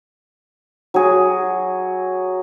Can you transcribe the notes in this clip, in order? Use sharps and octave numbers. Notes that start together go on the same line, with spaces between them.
F#3 G#4